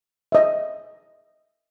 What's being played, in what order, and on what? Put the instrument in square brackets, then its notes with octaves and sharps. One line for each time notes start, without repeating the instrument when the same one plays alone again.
[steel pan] D#5 E5